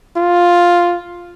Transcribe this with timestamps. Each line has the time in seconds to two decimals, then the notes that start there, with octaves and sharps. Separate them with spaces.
0.16 F4